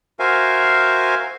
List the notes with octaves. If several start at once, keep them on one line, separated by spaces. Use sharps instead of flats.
F#4 A#4 C5 E5 F5 G#5